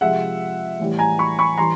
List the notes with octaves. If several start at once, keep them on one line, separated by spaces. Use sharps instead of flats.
C3 F3 G#3 E5 F#5
A2 E3 G3
G#5 A#5
B5 C#6
B5 C#6
E3 G3 A#5 C6